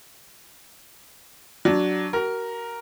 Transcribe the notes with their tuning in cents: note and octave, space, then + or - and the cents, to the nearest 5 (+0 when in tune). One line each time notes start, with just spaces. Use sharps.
F#3 +5 D4 +0
F#4 +40 A#4 +0